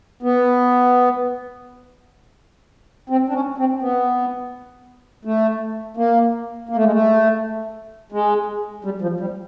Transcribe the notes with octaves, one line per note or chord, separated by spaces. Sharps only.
B3
C4
D4
C#4
C4
B3
A3
A#3
A#3
A3
G#3
A3
G#3
G3
F3
G3